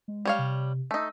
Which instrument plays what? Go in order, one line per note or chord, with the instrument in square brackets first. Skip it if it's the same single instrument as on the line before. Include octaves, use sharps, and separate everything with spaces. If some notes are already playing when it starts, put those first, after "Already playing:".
[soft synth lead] G#3
[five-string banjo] G3 C#5 F5
[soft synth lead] C3
[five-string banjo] A3 D#4 [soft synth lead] E6